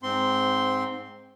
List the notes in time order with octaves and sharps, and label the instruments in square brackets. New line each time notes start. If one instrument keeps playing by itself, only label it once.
[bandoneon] G#2 C4 C6